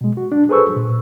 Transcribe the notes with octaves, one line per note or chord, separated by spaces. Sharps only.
B2 G#3
F#4
D4
G#4 A4 B4 C5 C#6 E6
A#2